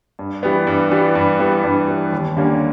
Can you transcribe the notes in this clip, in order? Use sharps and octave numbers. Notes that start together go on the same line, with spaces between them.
G2
E3 G3 B3
G2
E3 G3 B3
G2
E3 G3 B3
G2
E3 G3 B3
D#2
D3 G3 A#3 C#4